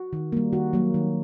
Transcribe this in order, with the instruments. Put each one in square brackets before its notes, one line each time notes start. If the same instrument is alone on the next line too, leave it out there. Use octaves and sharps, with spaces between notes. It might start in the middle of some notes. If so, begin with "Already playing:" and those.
Already playing: [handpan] F#4
D#3
G3 A#3
D#3 F#4
F#3 A#3
D#3